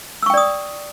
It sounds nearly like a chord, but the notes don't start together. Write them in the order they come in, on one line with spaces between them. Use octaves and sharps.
E6 C#6 G5 D5 D#6